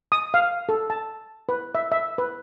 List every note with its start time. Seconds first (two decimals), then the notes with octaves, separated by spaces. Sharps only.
0.12 D#6
0.34 F5
0.69 A4
0.90 A5
1.49 B4
1.75 E5
1.92 E5
2.18 B4